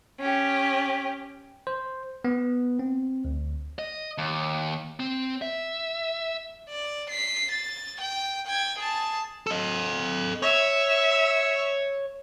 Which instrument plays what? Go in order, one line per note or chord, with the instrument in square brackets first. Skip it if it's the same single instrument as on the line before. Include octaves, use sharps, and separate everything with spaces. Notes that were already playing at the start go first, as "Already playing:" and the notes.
[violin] C#4 G4
[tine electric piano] C5
B3
C4
D2
[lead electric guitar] D#5
D#2
C4
E5
[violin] D5
B6 C7
A6
G5
G5 G#6
G#4 A5
[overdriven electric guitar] A4 D#5
[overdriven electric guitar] C#5 [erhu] E5